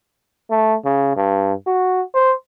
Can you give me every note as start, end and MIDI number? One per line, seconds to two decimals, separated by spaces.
0.51 0.75 57
0.85 1.13 49
1.16 1.53 43
1.67 2.02 66
2.14 2.33 72